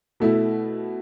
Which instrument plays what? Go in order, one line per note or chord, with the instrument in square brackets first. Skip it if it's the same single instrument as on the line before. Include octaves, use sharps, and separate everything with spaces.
[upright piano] B2 A3 E4